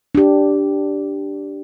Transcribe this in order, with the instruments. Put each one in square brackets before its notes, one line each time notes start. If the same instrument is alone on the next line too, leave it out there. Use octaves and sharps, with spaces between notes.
[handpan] D4 G4